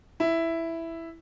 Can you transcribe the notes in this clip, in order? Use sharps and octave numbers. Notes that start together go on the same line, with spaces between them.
E4